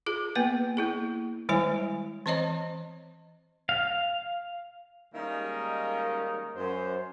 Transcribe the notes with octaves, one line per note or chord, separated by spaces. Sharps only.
F4 G#4
A#3 B3 B4
A#3 E4 G#4
D#3 G3 G#3 E4 C#5 G#5
E3 C4 C5 C#5 D#5 A#5
F5
D#3 G3 G#3 A#3 C#4 D#4
F#2 C5